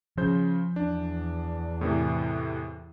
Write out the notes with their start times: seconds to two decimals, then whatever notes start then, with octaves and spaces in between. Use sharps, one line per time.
0.17 C#3 F3 C5 G6
0.76 E2 D4
1.81 A2 C3 E3